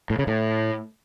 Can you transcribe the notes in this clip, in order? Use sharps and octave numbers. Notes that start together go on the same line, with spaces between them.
A2
C#3
A2